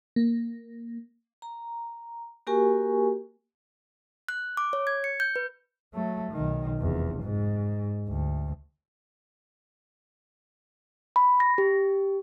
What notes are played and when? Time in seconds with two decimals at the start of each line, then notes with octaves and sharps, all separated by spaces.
0.16 A#3
1.42 A#5
2.47 A#3 F#4 G4 A#4 G#5 C#6
4.29 F#6
4.57 D6
4.73 C#5
4.87 G#6
5.04 C#7
5.20 G6
5.36 B4
5.94 F#3 A3
6.32 B1 D#3
6.80 F1 E2
7.22 G#2
8.08 D2
11.16 B5
11.40 A#6
11.58 G4